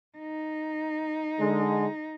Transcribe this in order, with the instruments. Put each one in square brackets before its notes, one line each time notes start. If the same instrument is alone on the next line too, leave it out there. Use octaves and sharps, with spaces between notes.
[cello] D#4
[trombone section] D3 G#3